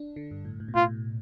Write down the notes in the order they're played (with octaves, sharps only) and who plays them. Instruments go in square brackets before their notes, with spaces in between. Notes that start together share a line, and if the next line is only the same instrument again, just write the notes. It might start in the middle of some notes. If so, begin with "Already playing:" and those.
Already playing: [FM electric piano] D4
D3
G2
A2
A2
B2
[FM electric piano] A2 [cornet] F4